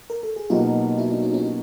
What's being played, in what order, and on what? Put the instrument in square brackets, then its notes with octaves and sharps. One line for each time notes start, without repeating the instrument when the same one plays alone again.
[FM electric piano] A#4
A4
G#4
[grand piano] B2 F#3 A#3 D#4 [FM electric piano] F4 G4
[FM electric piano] E4 F#4
D4 E4
C#4 D#4
C#4 D#4